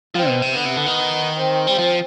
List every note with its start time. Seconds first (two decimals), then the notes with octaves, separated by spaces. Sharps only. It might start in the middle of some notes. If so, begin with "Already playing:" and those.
0.15 F3 C4
0.28 B2
0.42 C3
0.55 D3 B3
0.66 C3
0.76 D3
0.86 D#3
1.37 C4
1.67 G3
1.78 F3